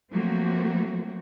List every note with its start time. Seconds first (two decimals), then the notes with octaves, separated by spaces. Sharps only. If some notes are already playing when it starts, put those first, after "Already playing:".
0.11 F3 F#3 A3 A#3 C4 F#4